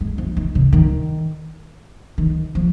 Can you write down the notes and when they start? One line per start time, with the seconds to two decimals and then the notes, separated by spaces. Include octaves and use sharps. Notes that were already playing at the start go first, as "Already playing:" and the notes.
0.01 G#3
0.18 F3
0.37 D#3
0.55 C3
0.73 D#3
2.18 D#3
2.55 F3